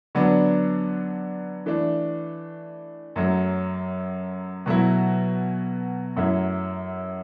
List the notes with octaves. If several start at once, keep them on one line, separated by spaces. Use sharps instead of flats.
D3 F#3 B3 D4
E3 A3 D4
F#2 F#3 A3
B2 F#3 A3 E4
F#2 F#3 A3 E4